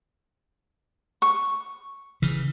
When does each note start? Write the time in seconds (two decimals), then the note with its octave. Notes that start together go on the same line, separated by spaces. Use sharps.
1.22 C#6
2.22 C#3 E3